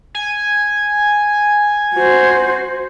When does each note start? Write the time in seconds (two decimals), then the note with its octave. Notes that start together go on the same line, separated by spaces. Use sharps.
0.15 G#5
1.95 F#4 C5